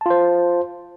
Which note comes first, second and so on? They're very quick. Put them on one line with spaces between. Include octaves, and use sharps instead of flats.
A5 F4 C5